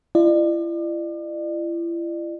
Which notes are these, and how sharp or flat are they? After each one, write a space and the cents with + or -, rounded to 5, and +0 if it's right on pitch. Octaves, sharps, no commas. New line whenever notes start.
E4 +40 D5 +40